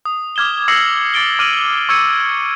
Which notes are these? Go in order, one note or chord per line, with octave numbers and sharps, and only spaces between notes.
D#6
D6 F6 G#6 E7 G7
D6 E6 A#6 C7 C#7 F#7
D6 A6 D7 G7
D6 F6 D#7 F#7
C#6 E6 G#6 C#7 D#7